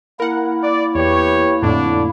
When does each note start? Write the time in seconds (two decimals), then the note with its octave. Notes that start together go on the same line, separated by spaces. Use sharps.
0.20 A#3 E4 A#4 F#5
0.63 D5
0.95 E2 G4 B4 C#5
1.63 F2 A2 D3 D4